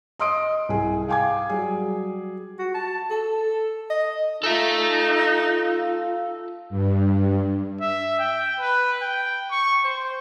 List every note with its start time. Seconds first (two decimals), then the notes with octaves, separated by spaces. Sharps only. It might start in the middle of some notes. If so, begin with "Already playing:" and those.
0.19 D#5 C6 D#6 D7
0.69 C2 G#4
1.08 F5 G5 G#5 D6 G#6
1.50 F#3 G3 G#4
2.59 F#4
2.75 A5
3.10 A4
3.90 D#5
4.43 D#4 F4 A4 E5
6.70 G2
7.81 E5
8.19 G5
8.60 B4
9.02 G5
9.51 C#6
9.84 C5